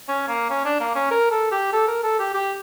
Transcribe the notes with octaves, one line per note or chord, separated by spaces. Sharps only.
C#4
A#3
C#4
D4
A#3
C#4
A#4
A4
G4
A4
A#4
A4
G4
G4